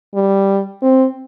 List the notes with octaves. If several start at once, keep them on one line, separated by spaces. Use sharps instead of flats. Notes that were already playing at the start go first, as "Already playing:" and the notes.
G3
C4